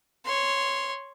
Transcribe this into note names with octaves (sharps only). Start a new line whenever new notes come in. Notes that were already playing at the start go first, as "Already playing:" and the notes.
C#5 C6